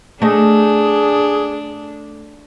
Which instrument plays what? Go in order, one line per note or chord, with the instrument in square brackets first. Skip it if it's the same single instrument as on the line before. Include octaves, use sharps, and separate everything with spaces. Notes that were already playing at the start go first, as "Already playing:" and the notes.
[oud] A3 D#5 [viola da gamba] D4 [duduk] G#4